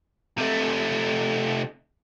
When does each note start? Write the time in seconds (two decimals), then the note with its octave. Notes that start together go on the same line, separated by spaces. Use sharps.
0.38 C3 A3